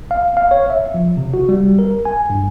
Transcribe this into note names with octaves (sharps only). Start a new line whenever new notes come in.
F5
F5
C#5
E5
F3
C3
F#4
G3
A#4
G#5
G2